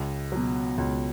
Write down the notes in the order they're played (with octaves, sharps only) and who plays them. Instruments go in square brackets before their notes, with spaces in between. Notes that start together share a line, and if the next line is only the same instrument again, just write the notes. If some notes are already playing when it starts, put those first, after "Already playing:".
Already playing: [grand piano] C#2
B2 F#3
C#2